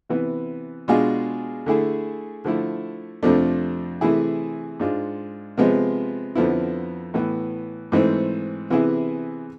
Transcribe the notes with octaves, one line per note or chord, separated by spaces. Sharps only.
C3 E3 B3
B2 G#3 D4 F4 G#4
D3 A3 E4 G#4
D3 F3 A3 E4
F2 C3 F3 A3 D4
C3 E3 A3 E4 G#4
G#2 G#3 D4 F4
C3 F3 G#3 B3
F2 D3 F3 B3 E4
A2 E3 B3
G#2 E3 A3 C4
C3 E3 B3 E4 G#4